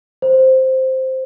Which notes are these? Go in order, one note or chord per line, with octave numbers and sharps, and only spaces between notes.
C5